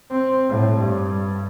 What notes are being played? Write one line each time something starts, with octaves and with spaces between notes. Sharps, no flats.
C4
A2
G2